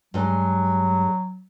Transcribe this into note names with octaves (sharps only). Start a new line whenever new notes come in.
G2 F#3 G#3